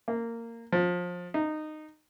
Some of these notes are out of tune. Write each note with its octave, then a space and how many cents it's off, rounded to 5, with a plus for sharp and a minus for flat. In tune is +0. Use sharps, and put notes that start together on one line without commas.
A#3 -15
F3 +25
D#4 -15